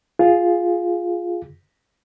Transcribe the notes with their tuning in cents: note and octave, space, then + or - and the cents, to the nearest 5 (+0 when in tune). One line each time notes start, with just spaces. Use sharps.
F4 +0 G#4 +0